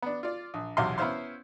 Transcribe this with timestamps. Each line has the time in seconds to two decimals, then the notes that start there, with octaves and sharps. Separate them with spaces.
0.02 B3 D4
0.23 F4 D5
0.54 A#1
0.77 B1 E2 C3 F#4 F5 C6
0.98 B3 C#4 E4 C5 F5 C6